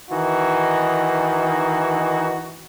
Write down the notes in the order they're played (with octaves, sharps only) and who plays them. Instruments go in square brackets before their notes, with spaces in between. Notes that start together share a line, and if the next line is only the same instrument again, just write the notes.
[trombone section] D#3 E3 D#4 F#4